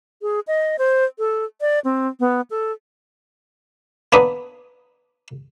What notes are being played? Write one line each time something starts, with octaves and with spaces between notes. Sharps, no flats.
G#4
D#5
C5
A4
D5
C4
B3
A4
A#3 B3 D4 B4 D#6